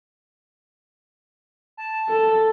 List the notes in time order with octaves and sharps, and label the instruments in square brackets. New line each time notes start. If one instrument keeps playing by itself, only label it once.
[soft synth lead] A5
[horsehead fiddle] A4